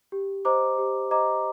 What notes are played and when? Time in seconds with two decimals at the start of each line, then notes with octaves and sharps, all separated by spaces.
0.12 G4
0.45 C5 D#5 A#5 D6
0.78 G4
1.11 C5 D#5 A#5 D6